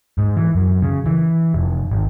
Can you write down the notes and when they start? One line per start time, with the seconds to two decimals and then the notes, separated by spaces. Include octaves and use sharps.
0.18 G#2
0.36 E3
0.55 F#2
0.82 C#3
1.06 E3
1.54 F1
1.91 G#1